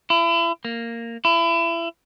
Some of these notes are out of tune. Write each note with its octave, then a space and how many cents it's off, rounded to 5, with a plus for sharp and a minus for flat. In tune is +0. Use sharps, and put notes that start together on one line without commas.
E4 +35
A#3 -10
E4 +30